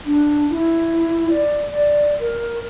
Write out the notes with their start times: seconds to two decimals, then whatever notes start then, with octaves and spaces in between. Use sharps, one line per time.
0.05 D4
0.50 E4
1.30 D5
1.71 D5
2.20 A#4